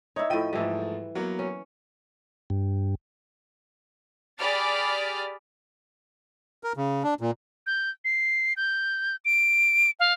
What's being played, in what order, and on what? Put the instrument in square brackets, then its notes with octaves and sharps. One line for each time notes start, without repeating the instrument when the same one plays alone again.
[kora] D#4 E4 [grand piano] C#5
[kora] A2 F3 [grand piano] G5 D#7
[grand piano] G#2 F3 A3 [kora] E3 G3
[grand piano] F#3 A#3 B3
[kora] C#4
[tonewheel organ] G2
[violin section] G4 G#4 D5 B5 F6 A6
[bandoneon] A#4
C#3
D4
A#2
[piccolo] G6
C7
G6
D7
F5